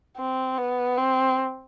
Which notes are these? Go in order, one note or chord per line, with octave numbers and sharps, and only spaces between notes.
C4
B3
C4